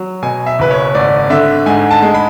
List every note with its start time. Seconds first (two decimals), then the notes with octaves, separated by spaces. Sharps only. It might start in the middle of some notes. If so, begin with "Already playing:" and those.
Already playing: F#3
0.23 B2 G#5
0.46 E5
0.59 F#1 B4
0.71 C#5
0.95 G#1 D5
1.30 D3 E5
1.66 G#2 G#5
1.91 A5
2.02 G#3
2.14 B5